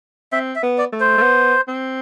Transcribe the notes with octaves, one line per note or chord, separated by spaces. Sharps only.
C4 E5
E5
B3
D5
A3
C5
A3
B3
C4